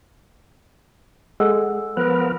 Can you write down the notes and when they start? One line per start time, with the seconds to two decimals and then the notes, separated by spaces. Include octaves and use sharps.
1.40 G#3 A4 F#5 E6
1.97 F3 B3 A#4 B4 F#6